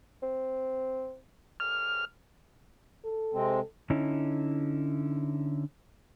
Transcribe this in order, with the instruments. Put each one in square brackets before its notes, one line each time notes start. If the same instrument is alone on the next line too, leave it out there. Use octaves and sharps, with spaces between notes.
[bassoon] C4
[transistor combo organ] F6
[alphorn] A4
[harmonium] C3 G#3 C4
[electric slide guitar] D3 C#4 D#4 E4